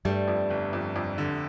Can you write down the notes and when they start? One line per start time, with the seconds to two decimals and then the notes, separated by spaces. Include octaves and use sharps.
0.05 G2 G3 A3
0.28 F2
0.50 G1
0.73 F2
0.96 F2
1.18 D3